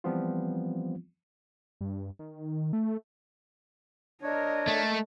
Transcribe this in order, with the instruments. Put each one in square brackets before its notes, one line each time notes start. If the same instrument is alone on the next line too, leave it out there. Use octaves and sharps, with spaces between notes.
[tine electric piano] E3 F3 G3 B3 C4 F4
[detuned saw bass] G2
D#3
A3
[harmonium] D4 C#5 [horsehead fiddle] A#4 D#5
[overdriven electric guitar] A3